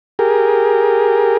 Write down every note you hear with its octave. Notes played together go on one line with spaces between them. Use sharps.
G4 G#4 A#4